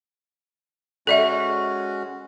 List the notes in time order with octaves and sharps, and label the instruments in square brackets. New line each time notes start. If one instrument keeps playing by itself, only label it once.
[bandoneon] G#3 C#4 F#4 [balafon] A4 D5 E5